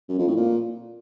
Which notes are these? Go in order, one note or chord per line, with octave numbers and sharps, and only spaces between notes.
F#2
F2
A2
A#2